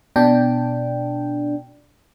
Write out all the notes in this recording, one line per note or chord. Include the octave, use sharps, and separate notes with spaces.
B2 D4 G5